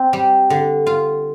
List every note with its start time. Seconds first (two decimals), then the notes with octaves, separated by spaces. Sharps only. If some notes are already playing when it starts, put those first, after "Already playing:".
Already playing: C4
0.13 G3
0.50 D3
0.87 F4